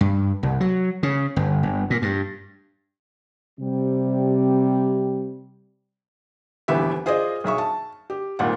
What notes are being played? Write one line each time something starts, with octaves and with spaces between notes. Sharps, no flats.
G2
C2
F#3
C#3
G1
G1
A#2
G2
C3 G3
D#1 D2 E3 B3 G4 E5
F4 G#4 C5 D5 D#5
B1 G#4 E5 C#6
A5
G4
D#1 G#1 A#2 F#5